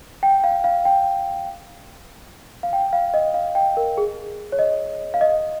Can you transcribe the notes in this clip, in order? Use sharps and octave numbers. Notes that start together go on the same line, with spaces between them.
G5
F5
F5
G5
F5
G5
F5
D#5
F5
G5
A#4
G#4
C#5
D#5
F5
D#5